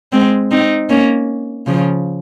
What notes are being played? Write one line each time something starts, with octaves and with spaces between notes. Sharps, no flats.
G#3 C4
C4 D#4
A#3 C#4
C#3 F3